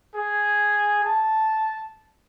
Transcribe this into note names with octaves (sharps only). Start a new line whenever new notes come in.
G#4
A5